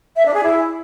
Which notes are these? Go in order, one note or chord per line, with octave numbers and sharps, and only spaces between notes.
E5
D4
G#4
E4